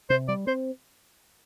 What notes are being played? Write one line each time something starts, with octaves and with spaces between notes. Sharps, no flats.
C3 C5
G3 D5
C4 C5